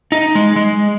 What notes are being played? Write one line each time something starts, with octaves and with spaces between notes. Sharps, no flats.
D#4
G#3
G#3